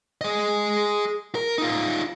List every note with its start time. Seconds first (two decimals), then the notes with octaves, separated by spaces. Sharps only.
0.21 G#4 D#5
1.35 A#4
1.58 D#4 F4